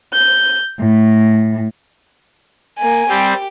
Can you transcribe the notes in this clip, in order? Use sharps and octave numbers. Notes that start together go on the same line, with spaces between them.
G6
A2
A#3 G#5
G3 C4 G4